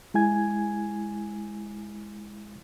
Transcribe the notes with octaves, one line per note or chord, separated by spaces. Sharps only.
G#3 E4 G#5 G#6